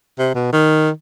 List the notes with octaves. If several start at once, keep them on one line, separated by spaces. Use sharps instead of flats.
C3
B2
D#3